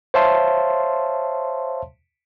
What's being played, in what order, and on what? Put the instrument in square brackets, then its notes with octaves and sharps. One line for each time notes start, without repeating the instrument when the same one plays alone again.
[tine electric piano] C5 C#5 E5 F5 A5 C6